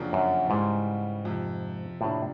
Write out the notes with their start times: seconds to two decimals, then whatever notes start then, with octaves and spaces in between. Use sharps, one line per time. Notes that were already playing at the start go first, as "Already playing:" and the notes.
Already playing: F2 C#3 F#3 A#3 D4
0.13 F#2
0.50 G#2 C#3 E3 G3
1.25 F2 C3 F3
2.01 F2 A2 C3 F3 A#3 D4